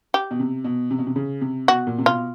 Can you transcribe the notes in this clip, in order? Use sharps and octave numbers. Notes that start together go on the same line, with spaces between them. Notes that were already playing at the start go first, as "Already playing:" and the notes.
G4
B2
C3
B2
C3
B2
C3
C#3
C3
B2 F#4
A#2
C3
B2 F4